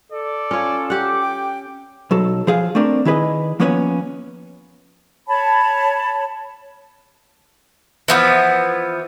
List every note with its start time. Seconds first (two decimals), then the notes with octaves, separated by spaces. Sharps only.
0.12 A4 D5
0.51 C#4 F4 C#5
0.90 G4 F#5 D6
1.22 G5
2.11 B1 F#3 A4
2.47 F3 G#4 F5
2.75 A3 C4 D4 A#4
3.05 D#3 E4 G#4 B4 D#5
3.60 F3 A#3 B3 C#4 B4 C#5
5.28 C#5 A5 B5
8.08 E3 F3 B3